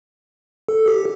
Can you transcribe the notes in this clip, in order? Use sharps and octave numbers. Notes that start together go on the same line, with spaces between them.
A4
G4